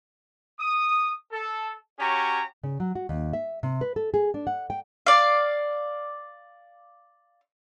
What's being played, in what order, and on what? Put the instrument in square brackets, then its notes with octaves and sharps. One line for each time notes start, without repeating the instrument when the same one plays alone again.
[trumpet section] D#6
A4
C#4 F#4 G4 C#5 A#5
[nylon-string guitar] C#3
F#3
F#4
D#2
E5
C3
B4
A4
G#4
D4
F#5
G5
[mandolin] D5 F5